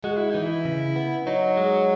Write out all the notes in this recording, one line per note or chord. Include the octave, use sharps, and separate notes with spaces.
G#3 F#4
E4
E3 D#4
E4
C#3
B3
F#3 D#4
G#3